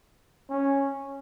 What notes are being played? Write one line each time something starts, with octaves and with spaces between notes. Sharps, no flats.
C#4